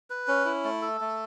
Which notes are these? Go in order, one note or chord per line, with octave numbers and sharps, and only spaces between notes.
B4
C#4
E4
A3
A4
A3